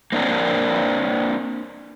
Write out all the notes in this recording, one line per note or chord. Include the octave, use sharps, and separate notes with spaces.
A#3 C4 D4 F4 A#4